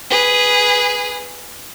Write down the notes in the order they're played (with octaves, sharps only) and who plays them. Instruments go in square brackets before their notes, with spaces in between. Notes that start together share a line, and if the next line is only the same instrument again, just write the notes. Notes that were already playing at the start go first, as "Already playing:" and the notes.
[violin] G#4 B4